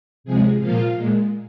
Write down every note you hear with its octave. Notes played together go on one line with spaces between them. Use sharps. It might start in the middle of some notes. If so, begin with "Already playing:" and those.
C3 F3 G#3 G#4
A#2 F3 A#3 F4
A#2 G#3